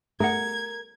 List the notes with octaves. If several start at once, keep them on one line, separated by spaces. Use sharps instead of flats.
A3 G#4 A#4 F#5 G#6